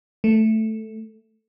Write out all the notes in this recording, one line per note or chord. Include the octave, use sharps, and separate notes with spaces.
A3